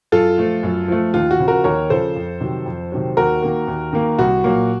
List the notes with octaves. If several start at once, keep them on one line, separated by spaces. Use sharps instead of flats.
F#2 F4 A4
F3 A3
F#2
F3 A3
D#2 F4
F#4
C#3 F3
F#4 A#4
D#2 A#4 C#5
C#3 F3 A4 C5
F2
C3 D#3 F#3
F2
C3 D#3 F#3
D#2 F#4 A#4
D#3 A#3
D#2
D#3 A#3
C2 F#4
A#2 F#3 A#3